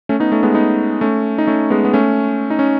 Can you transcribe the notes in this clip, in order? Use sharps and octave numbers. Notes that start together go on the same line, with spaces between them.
A3 C#4
B3 D#4
A3 C#4
G#3 B3
B3 D#4
A3 C#4
D#4
A3 C#4
G#3 B3
B3
A3 C#4
D#4
C#4